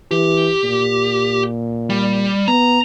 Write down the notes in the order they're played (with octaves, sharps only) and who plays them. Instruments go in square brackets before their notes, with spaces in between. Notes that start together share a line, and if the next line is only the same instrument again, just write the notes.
[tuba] E3 [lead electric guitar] G4
[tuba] A#2
[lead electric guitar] G3
[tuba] B3 [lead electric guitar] A#5